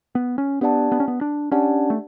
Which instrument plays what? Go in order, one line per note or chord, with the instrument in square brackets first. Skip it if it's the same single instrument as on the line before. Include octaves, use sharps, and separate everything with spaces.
[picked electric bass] B3
C#4
[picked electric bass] B3 [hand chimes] D4 G4 D5 F#5 A5
[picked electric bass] B3
C#4
B3
D4
[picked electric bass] C#4 [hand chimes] D4 G4 D5 F#5 A5
[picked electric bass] A3